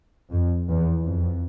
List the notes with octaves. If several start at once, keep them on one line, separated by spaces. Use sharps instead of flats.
F2
E2
F2